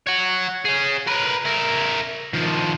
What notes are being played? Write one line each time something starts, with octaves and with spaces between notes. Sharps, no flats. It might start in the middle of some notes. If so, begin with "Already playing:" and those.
C#5 F#5
C#4 G#4
A#4 B4
E4 A#4
D#3 F3